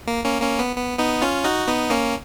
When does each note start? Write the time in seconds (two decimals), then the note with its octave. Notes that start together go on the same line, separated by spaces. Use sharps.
0.07 A#3
0.25 A#3 C#4
0.42 A#3 C#4
0.59 B3
0.76 B3
0.99 B3 D#4
1.22 C#4 F4
1.44 D#4 F#4
1.68 B3 D#4
1.90 A#3 C#4